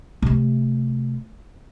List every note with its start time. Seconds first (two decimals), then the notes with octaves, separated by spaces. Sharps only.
0.22 C3 A3